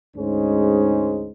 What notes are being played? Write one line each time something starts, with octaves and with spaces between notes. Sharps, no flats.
D2 G#2 G#3 C#4 D#4 C5